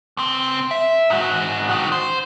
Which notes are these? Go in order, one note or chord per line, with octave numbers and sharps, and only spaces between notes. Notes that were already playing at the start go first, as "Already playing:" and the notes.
C#2 C4
E5
G#2 F#4
D#3 F#4
C5